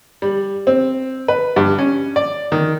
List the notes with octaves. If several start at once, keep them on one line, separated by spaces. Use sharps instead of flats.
G3
C4
B4
G2
C#4
D5
D#3